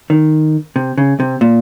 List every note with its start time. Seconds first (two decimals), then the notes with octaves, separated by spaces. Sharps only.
0.10 D#3
0.76 C3
0.98 C#3
1.20 C3
1.41 A#2